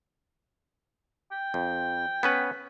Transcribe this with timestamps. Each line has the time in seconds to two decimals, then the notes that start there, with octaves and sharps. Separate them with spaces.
1.32 G5
1.54 F2
2.23 B3 C#4 B4